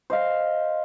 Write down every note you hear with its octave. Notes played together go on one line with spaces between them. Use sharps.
C5 D#5 F5